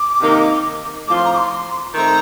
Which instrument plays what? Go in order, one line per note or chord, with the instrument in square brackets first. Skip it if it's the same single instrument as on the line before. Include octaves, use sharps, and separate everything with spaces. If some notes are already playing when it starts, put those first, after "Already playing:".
Already playing: [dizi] D6
[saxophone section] C3 D#3 A#3 D#4 A#4
[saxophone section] A2 F3 C4 F4 [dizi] D6
[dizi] C6
A#5
D6
C6
[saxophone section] D#3 A3 C4 [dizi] A#5